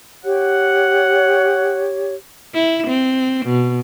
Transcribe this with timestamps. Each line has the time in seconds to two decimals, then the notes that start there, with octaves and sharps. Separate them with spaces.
0.24 G4 C#5 F#5
2.54 E4
2.88 C4
3.46 B2